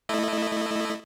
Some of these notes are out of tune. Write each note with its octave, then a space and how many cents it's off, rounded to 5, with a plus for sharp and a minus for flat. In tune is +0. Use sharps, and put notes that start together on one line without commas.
A3 +0 E4 +0 D#5 -25